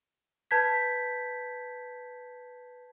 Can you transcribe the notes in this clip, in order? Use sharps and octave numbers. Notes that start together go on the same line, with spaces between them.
B4 A5 G6 G#6 B6